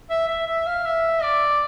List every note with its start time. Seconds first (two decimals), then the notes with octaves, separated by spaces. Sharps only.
0.10 E5
0.28 E5
0.47 E5
0.66 F5
0.85 E5
1.23 D5